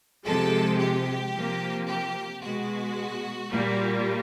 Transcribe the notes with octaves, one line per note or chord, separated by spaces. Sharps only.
C3 F3 G#3 A4
G4
C3 F3 A#3
G4
B2 G#3 F#4
A#2 G3 A#3